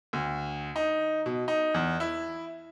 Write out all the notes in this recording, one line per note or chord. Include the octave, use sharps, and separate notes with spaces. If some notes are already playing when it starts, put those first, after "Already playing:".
D2
D#4
B2
D#4
E2
E4